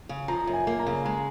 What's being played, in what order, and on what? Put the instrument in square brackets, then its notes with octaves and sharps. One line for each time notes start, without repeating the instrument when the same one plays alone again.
[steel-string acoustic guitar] C#3
[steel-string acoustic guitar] F3 [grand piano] A#5
[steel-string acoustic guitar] F#2
[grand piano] G#5
[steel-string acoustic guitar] A#3
[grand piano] A#5
[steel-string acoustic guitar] C#3
[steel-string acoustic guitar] G#3 [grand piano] A#5